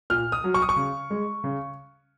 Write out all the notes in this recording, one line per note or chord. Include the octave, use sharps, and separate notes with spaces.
A#2 F6
D#6
F#3
C#6
D#6
C#6
C#3
G#3
C#3